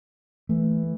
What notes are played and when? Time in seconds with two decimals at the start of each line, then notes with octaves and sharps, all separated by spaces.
0.49 E3 A3